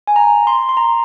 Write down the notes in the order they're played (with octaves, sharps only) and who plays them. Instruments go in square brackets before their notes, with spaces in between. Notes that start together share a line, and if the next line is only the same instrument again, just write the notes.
[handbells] G#5
A#5
C6
C6
A#5